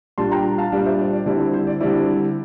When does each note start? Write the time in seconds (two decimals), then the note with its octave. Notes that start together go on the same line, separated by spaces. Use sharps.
0.18 A#2 G3 D4 A5 C6
0.31 G5 A#5
0.58 F5 A5
0.72 A#2 G3 D4 D5 F5
0.86 C5 E5
0.99 D5
1.13 D5
1.26 D3 G3 C4 E4 D5
1.40 C5
1.54 C5
1.67 D5
1.81 D3 G3 C4 E4 D5